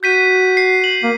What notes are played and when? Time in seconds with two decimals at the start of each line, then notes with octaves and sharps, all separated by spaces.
0.03 F#4 G6 B6 D#7
0.57 C7
0.82 C7 F#7
1.03 A#3